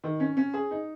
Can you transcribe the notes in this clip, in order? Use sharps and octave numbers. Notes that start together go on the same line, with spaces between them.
D#3
C#4
C#4
G#4
D#4